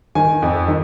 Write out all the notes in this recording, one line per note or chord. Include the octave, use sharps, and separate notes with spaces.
D#3 G#5
F2
D#3